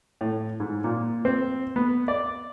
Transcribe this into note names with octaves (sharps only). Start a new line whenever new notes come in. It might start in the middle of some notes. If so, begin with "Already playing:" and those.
A2
G#2
A#2
C4
B3
D5